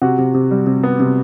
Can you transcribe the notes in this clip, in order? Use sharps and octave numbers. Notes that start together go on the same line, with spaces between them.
C3 F#4 F#5
C3
C3
G3
C3
B3
C3